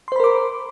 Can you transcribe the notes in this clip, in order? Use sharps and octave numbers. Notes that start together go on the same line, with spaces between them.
A#4 C5 B5 C6 D6